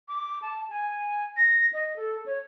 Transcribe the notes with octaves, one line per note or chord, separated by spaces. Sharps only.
D6
A5
G#5
A#6
D#5
A4
C#5